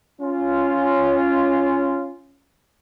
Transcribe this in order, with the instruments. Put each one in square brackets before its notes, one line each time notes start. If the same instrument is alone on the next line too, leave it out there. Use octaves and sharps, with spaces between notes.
[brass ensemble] C#4 F4